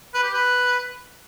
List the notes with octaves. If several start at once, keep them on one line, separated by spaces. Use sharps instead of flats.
B4
G4
B4